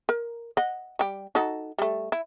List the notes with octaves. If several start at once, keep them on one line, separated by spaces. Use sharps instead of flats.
A#4
D#5 F#5
G3 G4
D#4 F#4 A4
G3 A3
E4